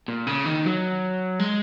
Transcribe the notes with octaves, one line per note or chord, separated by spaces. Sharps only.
A#2
C#3
D#3
F#3
G#3